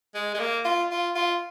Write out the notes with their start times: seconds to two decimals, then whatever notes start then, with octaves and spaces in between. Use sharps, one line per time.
0.15 G#3
0.35 G#3
0.40 A#3
0.65 F4
0.91 F4
1.16 F4